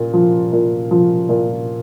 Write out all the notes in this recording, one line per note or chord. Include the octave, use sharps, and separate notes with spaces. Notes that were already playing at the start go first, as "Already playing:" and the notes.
Already playing: A#2
F3
A#2
F3
A#2